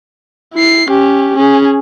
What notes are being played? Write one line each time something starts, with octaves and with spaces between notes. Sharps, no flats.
E4 C7
C#4 G4
C#4 G#4